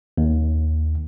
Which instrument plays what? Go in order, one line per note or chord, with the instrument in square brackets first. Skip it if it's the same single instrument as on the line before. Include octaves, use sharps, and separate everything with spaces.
[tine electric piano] D#2